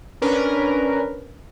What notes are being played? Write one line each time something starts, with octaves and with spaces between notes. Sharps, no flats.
C#4 D4 A#4 B4